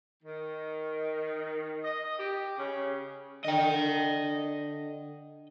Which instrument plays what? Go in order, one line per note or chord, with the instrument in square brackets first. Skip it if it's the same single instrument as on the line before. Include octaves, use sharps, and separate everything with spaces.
[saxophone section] D#3
D#5
G4
C#3
[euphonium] D3 [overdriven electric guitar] D#5 G5